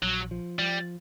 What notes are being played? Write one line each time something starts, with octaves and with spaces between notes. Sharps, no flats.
A#1 F#3
F3
F3 G3